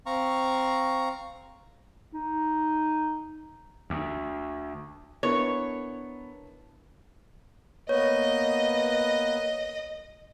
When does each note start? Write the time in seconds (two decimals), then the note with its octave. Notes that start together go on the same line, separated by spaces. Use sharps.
0.06 C4 F5 A#5 C#6
2.13 D#4
3.90 D2
5.23 B3 D4 E4 A#4 C#5
7.89 A#3 B3 B4 C#5 D#5